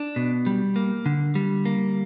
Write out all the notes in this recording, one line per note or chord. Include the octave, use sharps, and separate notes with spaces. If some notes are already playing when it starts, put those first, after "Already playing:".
Already playing: D4
B2
G3
A#3
D3
G3
A#3